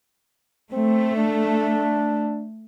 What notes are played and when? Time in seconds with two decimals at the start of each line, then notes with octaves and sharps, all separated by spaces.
0.72 A3 C4
1.16 D4